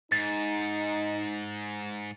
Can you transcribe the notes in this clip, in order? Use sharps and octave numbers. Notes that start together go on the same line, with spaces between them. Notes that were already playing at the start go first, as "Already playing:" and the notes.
G#2 D#4 A6